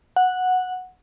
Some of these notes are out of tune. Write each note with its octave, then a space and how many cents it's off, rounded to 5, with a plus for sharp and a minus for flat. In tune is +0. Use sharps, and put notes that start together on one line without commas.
F#5 -10